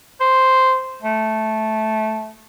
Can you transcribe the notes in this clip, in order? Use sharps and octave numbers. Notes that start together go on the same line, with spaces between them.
C5
A3